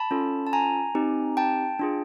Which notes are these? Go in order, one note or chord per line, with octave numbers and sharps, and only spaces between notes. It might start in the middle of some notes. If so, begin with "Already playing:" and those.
Already playing: A5 B5
C#4 F4 A4
A5
G#5 A#5
C4 D#4 G4
G5 A5
D4 F4 G#4